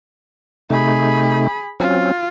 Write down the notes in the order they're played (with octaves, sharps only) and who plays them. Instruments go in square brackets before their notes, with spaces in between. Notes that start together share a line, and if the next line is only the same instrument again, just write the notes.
[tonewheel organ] C3 A3 D#4 [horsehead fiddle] G#4 B5
[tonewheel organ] F#3 C4 C#4 [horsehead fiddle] F4